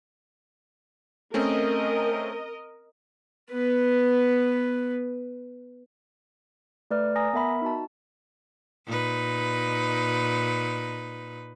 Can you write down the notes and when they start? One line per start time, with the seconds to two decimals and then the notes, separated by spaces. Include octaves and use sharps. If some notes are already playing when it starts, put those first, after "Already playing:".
1.34 A3 C4 C#4 A#4 D#5
3.51 B3 B4
6.91 A3 B4 D5 F6
7.16 G#5 A#5 D#6 A#6
7.33 B3 A#4 E5 B5
7.62 D#4 F#4 A5
8.86 A#2 D#4 B4